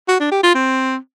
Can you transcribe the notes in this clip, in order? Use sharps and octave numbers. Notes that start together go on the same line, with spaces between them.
F#4
D4
G4
F4
C4